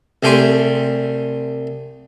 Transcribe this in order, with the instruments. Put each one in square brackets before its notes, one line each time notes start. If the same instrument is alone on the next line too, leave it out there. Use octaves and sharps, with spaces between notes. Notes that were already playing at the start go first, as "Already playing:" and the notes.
[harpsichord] C2 A3 G4 G#5 C6